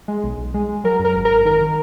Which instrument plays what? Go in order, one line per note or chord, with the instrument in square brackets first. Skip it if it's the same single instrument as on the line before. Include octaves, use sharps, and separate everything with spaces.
[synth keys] G#3
B1
B1
G#3
G#3
F#3 A#4
F#2
A#4
G#1
A#4
G#1
D#3 A#4
D#3